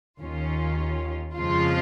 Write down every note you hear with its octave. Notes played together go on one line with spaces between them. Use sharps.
D#2 D#3 C#4 F4
F2 C#3 F3 G#3 F4